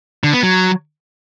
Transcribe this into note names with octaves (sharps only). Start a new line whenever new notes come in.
D3
B3
F#3